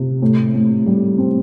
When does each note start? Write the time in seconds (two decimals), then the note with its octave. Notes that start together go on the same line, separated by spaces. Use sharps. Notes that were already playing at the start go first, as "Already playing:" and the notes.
Already playing: C3
0.22 A2
0.54 A2
0.86 G3
1.18 C4